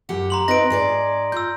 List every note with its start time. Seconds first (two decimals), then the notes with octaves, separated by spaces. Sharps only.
0.09 F#2 G4 F#5
0.30 A#5 C6 F#7
0.48 C4 D#4 B4 A#6 D7
0.70 G#2 G#4 D5
1.32 F4 E6 G6